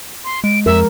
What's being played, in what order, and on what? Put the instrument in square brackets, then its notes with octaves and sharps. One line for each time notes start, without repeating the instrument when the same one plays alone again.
[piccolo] C6
[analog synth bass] G#3 [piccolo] D7
[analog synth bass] F2 [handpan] F3 G#3 A#4 [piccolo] E5